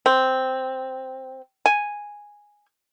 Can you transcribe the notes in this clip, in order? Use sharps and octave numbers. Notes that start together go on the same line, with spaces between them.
C4
G#5